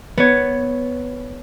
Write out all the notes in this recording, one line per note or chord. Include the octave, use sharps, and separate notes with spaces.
B3 C#5